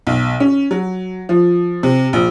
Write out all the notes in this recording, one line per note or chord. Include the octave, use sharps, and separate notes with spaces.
B1
C#4
F#3
F3
C3
A#1